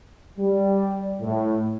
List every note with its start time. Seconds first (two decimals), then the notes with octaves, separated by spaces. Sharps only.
0.38 G3
1.21 A2